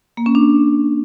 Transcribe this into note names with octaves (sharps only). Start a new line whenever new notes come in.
A#3
C#4
D4